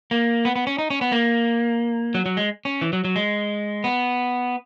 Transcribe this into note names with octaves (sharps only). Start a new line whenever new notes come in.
A#3
B3
B3
C#4
D#4
C#4
B3
A#3
F#3
F#3
G#3
C#4
E3
F#3
F#3
G#3
B3